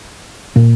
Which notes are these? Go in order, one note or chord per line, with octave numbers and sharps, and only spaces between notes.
A#2 A#3